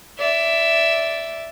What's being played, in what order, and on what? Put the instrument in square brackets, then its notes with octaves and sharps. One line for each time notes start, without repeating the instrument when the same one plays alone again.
[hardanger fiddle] D5 E5